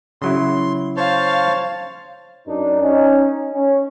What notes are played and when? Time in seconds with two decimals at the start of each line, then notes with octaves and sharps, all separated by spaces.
0.22 C#3 F#3 E4 C6
0.97 C5 C#5 F5 A5
2.47 F#2 D4 D#4
2.82 C#4 D#4
3.52 C#4